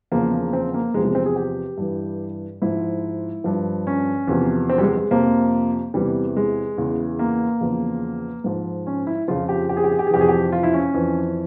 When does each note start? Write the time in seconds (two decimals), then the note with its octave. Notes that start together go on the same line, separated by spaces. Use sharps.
0.12 E2 C#3 F3 A#3
0.32 A#3
0.53 C4
0.74 A#3
0.94 E2 C3 F3 G#3
1.05 G#3
1.15 C4
1.26 G#4
1.36 G4
1.77 G2 E3
2.62 G#2 F3 E4
3.44 G2 F3
3.87 C#4
4.27 E2 C3 F3
4.69 C4
4.78 G3
4.83 G#3
4.97 G#3
5.11 F2 C3 F3 A#3
5.94 E2 C3 E3 G3
6.36 G#3
6.78 E2 C#3 E3
7.19 A#3
7.61 E2 C#3 F3
8.44 G#2 F3
8.87 C#4
9.07 E4
9.28 F2 C#3 F3 F4
9.49 G4
9.69 G4
9.77 G#4
9.84 G4
9.92 G#4
9.99 G4
10.07 G#4
10.11 F2 C3 E3 G4
10.21 G#4
10.28 G4
10.52 F4
10.63 E4
10.74 C#4
10.94 F2 E3